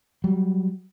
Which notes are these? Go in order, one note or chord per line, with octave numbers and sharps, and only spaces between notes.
F#3 G3